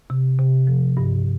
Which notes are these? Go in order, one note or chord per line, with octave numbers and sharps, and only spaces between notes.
C3
C3
F3
G2